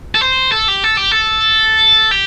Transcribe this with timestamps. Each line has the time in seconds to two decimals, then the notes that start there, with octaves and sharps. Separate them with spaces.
0.15 A4
0.21 C5
0.52 A4
0.68 G4
0.84 A4
0.97 G4
1.11 A4
2.11 G4